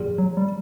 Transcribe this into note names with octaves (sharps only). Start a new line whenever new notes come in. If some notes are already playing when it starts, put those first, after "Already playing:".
Already playing: A#1 A#2
F#3
G3